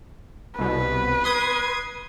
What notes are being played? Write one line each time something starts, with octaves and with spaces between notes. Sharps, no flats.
C2 B2 B4
C6 D#6 G#6